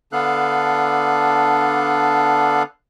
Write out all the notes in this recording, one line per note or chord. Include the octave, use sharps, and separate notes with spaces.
D3 B3 D4 A4 F5 F#6